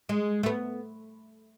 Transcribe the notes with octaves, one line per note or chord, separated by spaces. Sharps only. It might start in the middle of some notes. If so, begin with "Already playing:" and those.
G#3
A3
B3